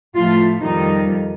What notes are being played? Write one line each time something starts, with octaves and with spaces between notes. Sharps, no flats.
A2 F3 A3 F4
F2 D#3 G3 D#4